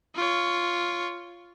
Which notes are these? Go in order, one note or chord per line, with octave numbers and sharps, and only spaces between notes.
F4 C#5